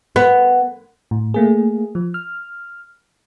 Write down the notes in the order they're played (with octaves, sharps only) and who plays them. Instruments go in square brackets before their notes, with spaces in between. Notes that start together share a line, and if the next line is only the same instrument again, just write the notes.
[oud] B3
[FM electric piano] A2
A3 A#3 G#4
F3
F6